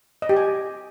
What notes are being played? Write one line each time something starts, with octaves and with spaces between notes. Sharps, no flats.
D#5
G4
G#5